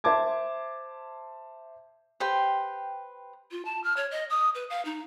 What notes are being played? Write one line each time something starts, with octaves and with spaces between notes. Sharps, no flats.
C5 E5 A5 D6 G#6
G4 B4 C5 G5
F4
A5
F6
C#5
D#5
D#6
B4
F5
D#4